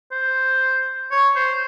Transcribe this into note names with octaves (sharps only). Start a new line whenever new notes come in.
C5
C#5
C5